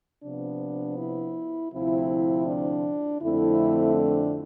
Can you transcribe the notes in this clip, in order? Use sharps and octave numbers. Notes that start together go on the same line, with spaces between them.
C3 F3 B3 D4
E4
D2 C3 F3 C4 E4
D4
F2 D3 A3 C4 E4
D4